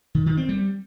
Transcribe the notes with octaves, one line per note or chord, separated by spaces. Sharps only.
D#3
D#3
C4
G3